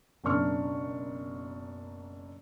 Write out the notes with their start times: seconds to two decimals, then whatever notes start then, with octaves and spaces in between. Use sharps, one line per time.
0.24 F#1 F#2 B2 D4 C#6 F6